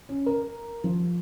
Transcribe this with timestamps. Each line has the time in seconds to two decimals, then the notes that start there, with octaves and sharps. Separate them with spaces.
0.09 C#4
0.26 A#4
0.84 F3